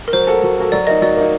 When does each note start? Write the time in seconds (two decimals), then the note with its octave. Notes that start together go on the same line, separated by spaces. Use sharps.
0.08 A#4
0.13 F#3 C5
0.27 A#3 F#4 A4
0.43 F#3
0.57 A#3 F#4 A4
0.72 F#3 D5
0.87 A#3 D#4 D#5
1.02 F#3 D5
1.16 A#3 D#4